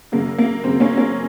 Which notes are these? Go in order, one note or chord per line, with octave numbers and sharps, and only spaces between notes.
F#2 C#3 A#3
A#3
F#2 C#3 C4
A#3 C#4
A#3 C#4